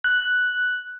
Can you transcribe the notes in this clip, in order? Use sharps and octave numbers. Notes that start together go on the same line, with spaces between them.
F#6